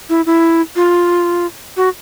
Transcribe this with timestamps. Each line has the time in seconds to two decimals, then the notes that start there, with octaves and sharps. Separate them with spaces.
0.09 E4
0.26 E4
0.76 F4
1.77 F#4